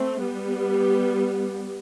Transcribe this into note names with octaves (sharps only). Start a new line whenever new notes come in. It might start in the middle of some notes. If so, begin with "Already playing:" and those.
Already playing: A3 C4
G3 B3